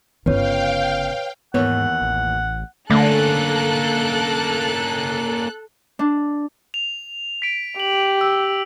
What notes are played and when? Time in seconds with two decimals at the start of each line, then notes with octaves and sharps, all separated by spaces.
0.26 G1 C#3 B4 C#5 F5 G5
1.54 D#2 G#2 E3 B3 C#5 F#5
2.02 A1
2.90 D3 A3 A#3 C#4 A4 F#6
5.99 D4
6.74 F7
7.42 B6 D7
7.80 G4 F#7
8.21 E6